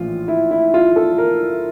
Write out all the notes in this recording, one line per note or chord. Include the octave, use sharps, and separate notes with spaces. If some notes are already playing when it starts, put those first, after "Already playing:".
Already playing: A#1 A2 E3 F4
E4
E4
F4
A4
A#4